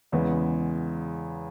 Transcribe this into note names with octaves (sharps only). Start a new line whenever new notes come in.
E2 C#3 E3 G#3 B3